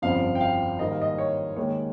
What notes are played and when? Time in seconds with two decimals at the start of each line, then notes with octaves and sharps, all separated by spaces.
0.02 G1 F2 C#3 F3 F5
0.35 G5
0.41 F5
0.79 G#2 D#3 G3 A#3 D#5
0.90 F5
1.02 D#5
1.18 C#5
1.56 D#2 D#3 G#3 C#5